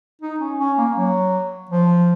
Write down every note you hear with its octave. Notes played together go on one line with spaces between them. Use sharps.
D#4
C#4
C#4
A#3
F#3
F3